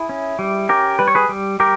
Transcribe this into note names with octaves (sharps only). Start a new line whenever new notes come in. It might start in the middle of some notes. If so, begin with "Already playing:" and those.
Already playing: E4 G#4
C#4
G3
C#4 G4 A#4
G3 B4
C#5
G#4 B4
G3
G3 G4 A#4